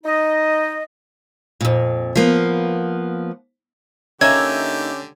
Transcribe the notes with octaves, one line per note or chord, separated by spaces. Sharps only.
D#4 D#5
F2 A#2
F3 A#3 B3
D3 A#3 C#4 D#4 G4 E5 G#6